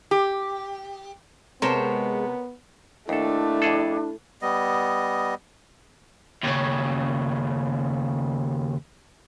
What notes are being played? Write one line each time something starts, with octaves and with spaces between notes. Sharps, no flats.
G4
C3 G#3 B3 A#4 C5 C#5 A5 C6
D#2 A3 D4 E4 A4
F2 G#4 A4
G3 B3 D#5
D#2 C#3